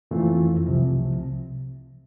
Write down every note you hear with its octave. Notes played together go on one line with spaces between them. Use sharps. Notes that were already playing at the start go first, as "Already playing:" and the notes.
F2 E3 A3 C4 F4
C2 C3 F3